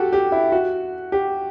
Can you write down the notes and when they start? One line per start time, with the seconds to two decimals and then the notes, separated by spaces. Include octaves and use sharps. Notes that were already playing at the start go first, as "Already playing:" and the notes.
Already playing: F#4 G4 A4
0.13 G4
0.32 E4
0.52 F#4
1.12 G4